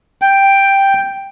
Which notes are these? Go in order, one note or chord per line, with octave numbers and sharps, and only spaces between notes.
G5